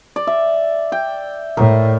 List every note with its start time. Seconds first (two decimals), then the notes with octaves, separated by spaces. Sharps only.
0.16 D5
0.27 E5
0.92 G5
1.57 A2 A#4